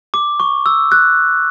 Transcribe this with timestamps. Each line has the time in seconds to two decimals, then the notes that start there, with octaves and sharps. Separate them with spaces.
0.14 D6
0.40 C#6
0.66 E6
0.92 F#6